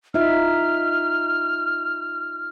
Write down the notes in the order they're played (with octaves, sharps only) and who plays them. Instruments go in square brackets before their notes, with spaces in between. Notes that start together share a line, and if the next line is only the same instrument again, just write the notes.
[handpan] D#4 F4 E5 [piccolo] F6